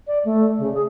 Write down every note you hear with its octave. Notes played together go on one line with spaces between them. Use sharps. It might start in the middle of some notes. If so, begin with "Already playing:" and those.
D5
A3
C#3
G#4